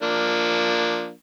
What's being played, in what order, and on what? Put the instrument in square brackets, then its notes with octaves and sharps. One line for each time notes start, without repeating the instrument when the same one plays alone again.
[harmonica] F3 A#3 D4